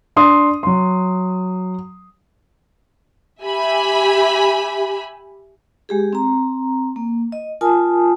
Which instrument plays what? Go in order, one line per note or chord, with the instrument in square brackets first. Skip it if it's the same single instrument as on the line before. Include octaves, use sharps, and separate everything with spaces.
[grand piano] D4 C6 D#6
F#3 C6
[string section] G4 E5 G#5 B5
[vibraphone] G#3 G4 G#4
C4 A#5
A#3
D#5
F4 A#4 G#5 A5 D#6